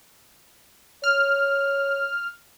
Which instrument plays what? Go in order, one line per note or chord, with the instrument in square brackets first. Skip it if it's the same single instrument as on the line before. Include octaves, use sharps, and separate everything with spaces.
[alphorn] C#5 [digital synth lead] F6